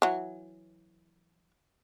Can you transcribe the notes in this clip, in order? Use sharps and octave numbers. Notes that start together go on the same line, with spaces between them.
E3 F#3